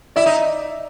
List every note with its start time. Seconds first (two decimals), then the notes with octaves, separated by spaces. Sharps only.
0.16 E4 D5 E5
0.26 D#4